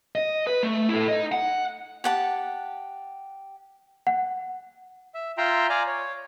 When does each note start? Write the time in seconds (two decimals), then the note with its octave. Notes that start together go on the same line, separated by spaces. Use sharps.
0.15 D#5
0.47 B4
0.63 A3
0.89 E4 A4
1.08 D#4 D#5
1.32 F#5
2.04 G4 F#5 A5
4.07 F#5
5.14 E5
5.38 F4 E5 G5 A#5 C6
5.69 D5 F5 G#5 A#5
5.87 C#5